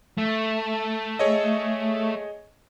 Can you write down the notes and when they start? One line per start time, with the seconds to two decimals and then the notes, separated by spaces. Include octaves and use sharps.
0.18 A3
1.19 G#4 C#5 D#5